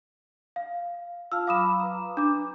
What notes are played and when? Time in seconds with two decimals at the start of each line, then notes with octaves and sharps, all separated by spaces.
0.56 F5
1.32 F4 F5 A5 E6 F6
1.47 F#3 F5 B5 D6 D#6 E7
1.80 B4 A#5
2.17 D4 D6